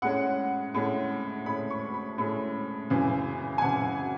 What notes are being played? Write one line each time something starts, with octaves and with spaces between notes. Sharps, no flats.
A2 G#3 C#4 F#5
A2 G#3 C#4
A2 G#3 C#4 B5
C#6
B5
A2 G#3 C#4
F#2 C#3 E3
G#5
F#2 C#3 E3 F#5